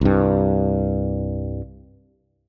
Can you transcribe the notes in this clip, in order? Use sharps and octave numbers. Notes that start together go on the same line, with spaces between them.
C2 G2